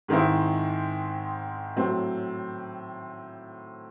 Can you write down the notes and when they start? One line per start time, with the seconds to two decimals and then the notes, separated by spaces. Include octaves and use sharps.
0.08 G#2 D#3 G#3 C4 E4
1.76 A2 F#3 C4